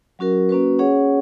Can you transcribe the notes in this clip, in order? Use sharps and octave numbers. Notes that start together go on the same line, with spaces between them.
F#3 C#4 F#4 A#4
A#3 C#4 F#4 B4
C#4 G#4 C#5 F#5